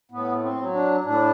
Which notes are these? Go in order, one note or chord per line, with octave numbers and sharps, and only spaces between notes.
A2 B3
C4
F#3
D4
A2 D4